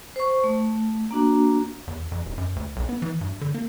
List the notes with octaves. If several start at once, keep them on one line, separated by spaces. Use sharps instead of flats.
C5 C#6
A3
A#3 D4 F#4
E2
F2
E1
F#2
D2
B1
B3
E3
G2
D3
A#3